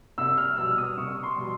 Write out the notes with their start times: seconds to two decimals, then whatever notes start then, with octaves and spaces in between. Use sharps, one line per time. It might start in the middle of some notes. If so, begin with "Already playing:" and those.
0.18 C2 E6
0.38 F6
0.57 B2 G3 E6
0.78 D#6
0.97 C2 C#6
1.23 C6
1.36 B2 G3